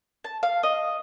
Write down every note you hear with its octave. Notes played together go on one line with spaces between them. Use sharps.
A5
F5
D#5